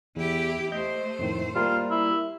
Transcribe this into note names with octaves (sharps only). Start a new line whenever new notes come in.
E2 E4 G4
A3 C5 D#5 G6
F2 A2 D#3
G3 A#3 F4 A#4
E4